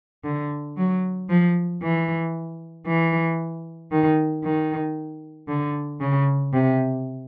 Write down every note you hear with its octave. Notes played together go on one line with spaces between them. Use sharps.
D3
F#3
F3
E3
E3
D#3
D#3
D3
C#3
C3